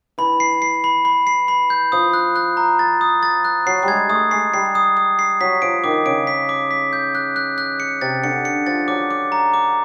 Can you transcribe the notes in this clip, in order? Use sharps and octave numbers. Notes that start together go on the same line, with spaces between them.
E3 B5
C7
C7
B5
B5
C7
B5
G6
F3 D#6
F#6
F#6
A#5
A6
D#6
A6
F#6
F#3 C7
G3
G#3 G#6
A3 D#6
G#3 C7
G3 C7
D#6
D#6
C7
F#3 B6
F3 D7
D#3 D6
C#3 D7
B6
D6
B6
G6
F#6
F#6
F#6
C#7
C3 A6
D3 C#7
C#7
F3 A6
F#3 D6
D6
A#5
D6